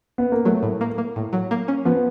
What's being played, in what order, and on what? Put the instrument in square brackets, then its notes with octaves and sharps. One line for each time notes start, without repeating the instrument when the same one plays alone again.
[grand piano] B3
A#3
[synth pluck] F#3 [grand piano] A3
[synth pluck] A2
A#3
A#3
A2
F#3
A#3
C#4
[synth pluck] F3 [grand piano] B3